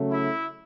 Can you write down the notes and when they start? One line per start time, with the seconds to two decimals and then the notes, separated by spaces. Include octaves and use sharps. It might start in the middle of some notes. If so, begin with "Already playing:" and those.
Already playing: C#3 F#3 A3
0.11 E4 E5